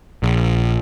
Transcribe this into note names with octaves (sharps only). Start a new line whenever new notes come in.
A#1